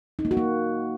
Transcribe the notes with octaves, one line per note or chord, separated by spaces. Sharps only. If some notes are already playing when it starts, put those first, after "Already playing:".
D#4
A#3
F#4
A#3